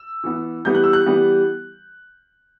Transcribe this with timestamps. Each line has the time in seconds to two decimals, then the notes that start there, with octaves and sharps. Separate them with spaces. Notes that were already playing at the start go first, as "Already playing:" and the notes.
Already playing: E6
0.24 E3 B3
0.65 E3 G3 B3 G6
0.75 F#6
0.84 E6
0.93 F#6
1.06 E3 G3 B3